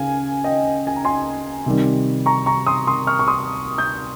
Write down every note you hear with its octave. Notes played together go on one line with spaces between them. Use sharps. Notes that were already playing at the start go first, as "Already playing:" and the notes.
Already playing: C#3 F5 G#5
D#5 G5
G#5
A#5
G#5 C6
C3 D#3 G3
A#5 C#6
A#5 C#6
C6 D#6
C6 D#6
C#6 F6
C#6
C6 D#6
D#6 G6